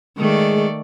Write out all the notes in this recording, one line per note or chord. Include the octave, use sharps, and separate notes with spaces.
D#3 G#3 A3 D5